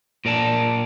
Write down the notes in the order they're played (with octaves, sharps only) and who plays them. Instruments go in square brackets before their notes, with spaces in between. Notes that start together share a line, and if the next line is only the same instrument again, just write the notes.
[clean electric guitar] A#2 A#4 D5 A5